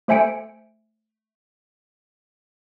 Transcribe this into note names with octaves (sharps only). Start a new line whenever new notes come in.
A3 C5 E5 G#5 C#7 D7